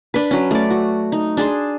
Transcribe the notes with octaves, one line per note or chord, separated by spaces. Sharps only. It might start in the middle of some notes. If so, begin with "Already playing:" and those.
D4 B4
F#3 C#4
A3 D5
F#4
D#4
D4 G#4 A5 C6